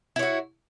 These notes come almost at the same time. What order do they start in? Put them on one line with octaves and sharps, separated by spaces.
E4 C#5 F#4